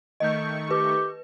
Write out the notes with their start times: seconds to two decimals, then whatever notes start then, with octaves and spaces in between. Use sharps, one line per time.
0.20 D#3 A3 D#5 C#6 G6
0.71 G4 B4